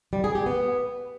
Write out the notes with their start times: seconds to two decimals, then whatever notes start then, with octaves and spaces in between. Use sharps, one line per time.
0.13 G3
0.24 G#4
0.35 G4
0.46 B3